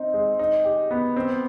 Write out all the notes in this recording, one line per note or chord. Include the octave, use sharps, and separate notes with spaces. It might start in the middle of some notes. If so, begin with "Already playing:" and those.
Already playing: C4 D#4
G#3
D#4
G4
B3
C4